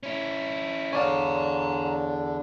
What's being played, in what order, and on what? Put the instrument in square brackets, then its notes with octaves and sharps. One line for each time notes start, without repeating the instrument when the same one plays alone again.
[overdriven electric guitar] C#4 E4
[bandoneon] E2 D3 D4 [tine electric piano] C#5 D5 F5 [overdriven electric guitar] G#5 A#5